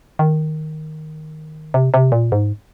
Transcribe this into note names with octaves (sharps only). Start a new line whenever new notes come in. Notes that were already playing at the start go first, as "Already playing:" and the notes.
D#3
C3
C3
A#2
G#2